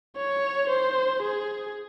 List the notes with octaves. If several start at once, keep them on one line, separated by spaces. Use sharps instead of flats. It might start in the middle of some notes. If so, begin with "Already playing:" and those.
C#5
C5
G#4